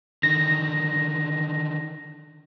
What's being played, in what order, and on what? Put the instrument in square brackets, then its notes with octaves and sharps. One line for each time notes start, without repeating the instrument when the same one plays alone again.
[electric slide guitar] D3 D#3 [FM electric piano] A#6